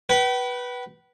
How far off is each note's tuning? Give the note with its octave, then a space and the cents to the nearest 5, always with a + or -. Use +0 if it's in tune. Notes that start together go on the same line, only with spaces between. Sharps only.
B4 -10 G5 -45